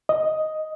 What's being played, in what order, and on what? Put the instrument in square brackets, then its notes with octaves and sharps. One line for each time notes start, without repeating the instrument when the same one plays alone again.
[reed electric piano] D#5